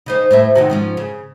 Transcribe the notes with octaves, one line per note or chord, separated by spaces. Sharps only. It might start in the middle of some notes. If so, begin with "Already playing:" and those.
C#3 D#4 C5
A2 C5 E5
C3 D#3 F#4
G#2 F3 C#4
C#3